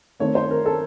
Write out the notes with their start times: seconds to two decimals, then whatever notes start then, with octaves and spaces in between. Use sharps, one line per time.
0.20 D#3 A3 C4 C#5
0.35 C5
0.51 A#4
0.66 A4